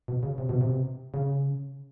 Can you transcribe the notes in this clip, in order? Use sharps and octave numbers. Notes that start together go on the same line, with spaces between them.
B2
C#3
C3
B2
C3
C#3